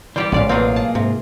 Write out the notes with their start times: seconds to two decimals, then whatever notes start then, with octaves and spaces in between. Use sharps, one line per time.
0.16 E3 G3 F4 G4 C5 D5
0.32 A1 G#2 C#3 G#3 D5 F5
0.49 B2 F#3 A#3 C4 F4 G#4 F5
0.76 A5
0.95 G#2 C3